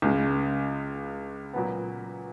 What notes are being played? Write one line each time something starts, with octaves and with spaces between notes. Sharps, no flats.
C#2 C#3 G#3
A#2 F#3 B3